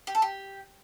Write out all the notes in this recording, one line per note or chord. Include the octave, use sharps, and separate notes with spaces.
G4
A4
G4